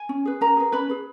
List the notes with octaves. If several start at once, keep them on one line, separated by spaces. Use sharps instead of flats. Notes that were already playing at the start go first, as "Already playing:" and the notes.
Already playing: G#5
C#4
G#4 B4
C#4 A#4 A#5
G#4 B4
C#4 B4 B5
G#4 B4